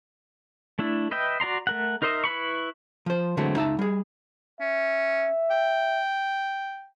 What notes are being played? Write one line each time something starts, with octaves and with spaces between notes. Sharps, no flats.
A3 D4 E4
B4 D#5 E5 G5
F#4 D5 A#5 C6
A3 A#4 F#5
D#4 A#4 C5 D#5 E5
E4 B4 B5 C#6
F3 C5
D3 E3 F#3 G#3 A3 C4
C#2 D#4 E5 A5
G3 G#4
C#4 E5
G5